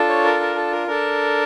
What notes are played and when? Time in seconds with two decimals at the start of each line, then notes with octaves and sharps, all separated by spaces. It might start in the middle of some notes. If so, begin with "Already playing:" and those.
Already playing: D4 F4 A4
0.09 C#5
0.24 A#4
0.40 A#4
0.56 A4
0.71 A#4
0.87 D4 A4 A#4